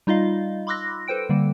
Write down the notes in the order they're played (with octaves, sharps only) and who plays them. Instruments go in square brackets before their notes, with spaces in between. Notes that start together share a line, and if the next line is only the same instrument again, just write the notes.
[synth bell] G3 D#4 F4 D#5 F5
B5 C6 D6 E6 F#6 A#6
A4 B4 C5 G5 D7
D3 G3 A#3